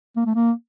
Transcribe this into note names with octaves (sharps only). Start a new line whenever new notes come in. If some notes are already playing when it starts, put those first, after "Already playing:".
A#3
A3
A#3